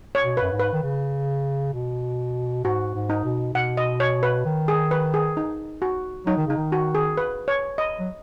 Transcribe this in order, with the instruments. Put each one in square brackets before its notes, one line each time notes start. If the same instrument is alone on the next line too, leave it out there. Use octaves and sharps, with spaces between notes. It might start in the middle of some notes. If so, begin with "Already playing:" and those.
[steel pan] C#5
[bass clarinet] B2
[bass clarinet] F#2 [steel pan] B4
[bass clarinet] G#2
[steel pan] B4
[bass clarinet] D#3
C#3
B2
[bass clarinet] G#2 [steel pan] F#4
[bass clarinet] G#2
[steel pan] D#4
[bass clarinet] B2
[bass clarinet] B2 [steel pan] F#5
[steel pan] D#5
C#5
B4
[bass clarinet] D#3
[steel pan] G#4
B4
G#4
D#4
F#4
[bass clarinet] F#3 [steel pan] D#4
[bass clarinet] D#3
[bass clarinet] C#3 [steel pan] D#4
[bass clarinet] D#3
[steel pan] F#4
G#4
B4
C#5
D#5
[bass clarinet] F#3